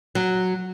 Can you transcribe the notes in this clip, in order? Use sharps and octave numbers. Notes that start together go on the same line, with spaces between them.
F#3